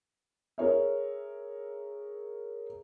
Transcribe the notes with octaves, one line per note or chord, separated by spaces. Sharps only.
G#4 A#4 C#5 E5